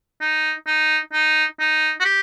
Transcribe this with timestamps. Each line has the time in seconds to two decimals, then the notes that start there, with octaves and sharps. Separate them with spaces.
0.21 D#4
0.67 D#4
1.13 D#4
1.59 D#4
2.00 F#4
2.05 G4